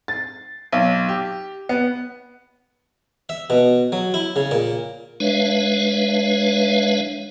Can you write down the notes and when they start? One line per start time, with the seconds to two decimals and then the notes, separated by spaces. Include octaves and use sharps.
0.08 A6
0.72 B1
1.09 G4
1.69 B3
3.29 E5
3.50 B2
3.92 F#3
4.14 E4
4.36 C#3
4.51 A#2
5.20 G#3 D4 B4 C#5 E5 F5